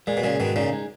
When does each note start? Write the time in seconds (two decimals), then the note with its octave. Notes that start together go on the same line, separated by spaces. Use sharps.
0.07 A#2 G#3
0.17 B2
0.24 A#2 C#3 G#3
0.40 G#2 B2 D#3
0.56 A#2 C#3 D#4
0.73 G#3